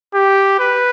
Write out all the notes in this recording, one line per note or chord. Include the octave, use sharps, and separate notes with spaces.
G4
B4